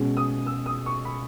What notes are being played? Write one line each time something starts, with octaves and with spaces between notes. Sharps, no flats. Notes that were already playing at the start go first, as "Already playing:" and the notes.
Already playing: B2 G#3 C#4
D#6
E6
D#6
C#6
B5